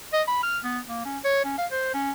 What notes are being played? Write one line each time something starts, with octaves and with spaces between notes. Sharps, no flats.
D#5
B5
F6
B3
A#3
C#4
C#5
C#4
F5
C5
C#4